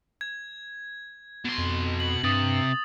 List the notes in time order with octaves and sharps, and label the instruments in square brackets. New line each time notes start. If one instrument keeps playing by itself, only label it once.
[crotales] G#6
[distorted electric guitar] B2 C6
[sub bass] F2
[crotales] F#7
[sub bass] G2 [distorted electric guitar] C3 [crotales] D#6 A6 F#7